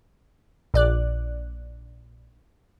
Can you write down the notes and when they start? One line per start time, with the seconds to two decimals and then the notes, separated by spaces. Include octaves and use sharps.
0.74 A#1 D5 F#6